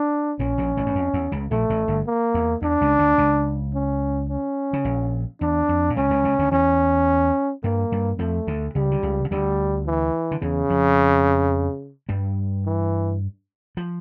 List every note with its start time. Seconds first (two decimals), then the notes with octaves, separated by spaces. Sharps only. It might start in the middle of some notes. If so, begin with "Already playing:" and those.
Already playing: D4
0.39 A#1 A#2 C#4
0.58 A#1 A#2
0.77 A1 A2
0.86 G2
0.95 F2
1.13 E2
1.32 C#2 C#3
1.51 A#1 A#2 A3
1.70 A1 A2
1.88 G1 G2
2.06 A#3
2.34 E2
2.62 E2 D4
2.81 C#2 C#3
2.99 D2 D3
3.18 C#2 C#3
3.74 C#4
4.30 C#4
4.73 C#3
4.85 A#1 A#2
5.41 E2 D4
5.69 F2
5.90 A#2
5.96 C#2 C#3 C#4
6.10 C#2 C#3
6.24 C#2 C#3
6.39 D2 D3
6.52 E2 E3 C#4
7.64 G2 G3 A#3
7.92 G2 G3
8.19 F2 F3 A3
8.47 D2 D3
8.75 C#2 C#3 G3
8.91 D3
9.03 C#2 C#3
9.25 C#3
9.31 D2 D3 G3
9.86 E3
10.31 D3
10.42 E2 C#3 E3
10.69 F2 F3
12.09 G2 G3
12.65 E3
13.77 F3